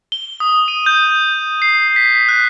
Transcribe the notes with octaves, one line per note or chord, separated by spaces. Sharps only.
G7
D#6
D#7
G6
C7
B6
F#6